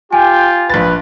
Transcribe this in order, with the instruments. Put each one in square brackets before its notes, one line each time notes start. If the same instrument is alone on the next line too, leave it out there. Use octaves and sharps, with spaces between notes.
[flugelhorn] F4 [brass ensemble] G4 G5 [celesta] G#5
[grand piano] A#1 A6 [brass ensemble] B4